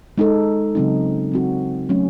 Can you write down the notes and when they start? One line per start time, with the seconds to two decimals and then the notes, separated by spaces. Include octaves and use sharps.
0.18 G#3 D#4 A4
0.75 C#3 F#3 C4 D#4
1.32 F#3 C4 F#4
1.89 F#3 A3 C#4